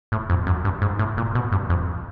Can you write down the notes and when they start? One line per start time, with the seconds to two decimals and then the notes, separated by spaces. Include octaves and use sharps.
0.12 A2
0.30 F2
0.47 F#2
0.65 G2
0.82 G#2
0.99 A2
1.17 A#2
1.35 B2
1.52 G2
1.70 F2